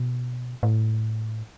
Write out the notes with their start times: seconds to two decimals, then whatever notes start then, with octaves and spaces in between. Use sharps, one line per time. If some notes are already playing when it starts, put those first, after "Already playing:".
Already playing: B2
0.63 A2